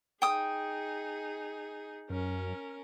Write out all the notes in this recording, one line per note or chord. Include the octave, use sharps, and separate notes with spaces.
D#4 G#4 G5 D#6
F#2 C#4 A#4